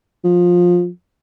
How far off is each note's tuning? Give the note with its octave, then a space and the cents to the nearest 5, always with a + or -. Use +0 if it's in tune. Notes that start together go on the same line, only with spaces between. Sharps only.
F3 +15